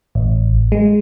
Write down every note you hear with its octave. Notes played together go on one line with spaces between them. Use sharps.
A1
G#3